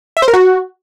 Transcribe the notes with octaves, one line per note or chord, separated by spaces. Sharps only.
E5
C5
A#4
F#4